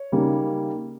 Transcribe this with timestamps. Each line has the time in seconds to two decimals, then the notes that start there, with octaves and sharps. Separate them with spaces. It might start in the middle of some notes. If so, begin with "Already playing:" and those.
Already playing: C#5
0.12 C#3 G3 A#3 D#4